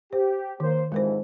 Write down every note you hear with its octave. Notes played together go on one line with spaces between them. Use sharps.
G4 C5
D#3 A#3 C5
F2 G#2 E3 G#3 A#4 C5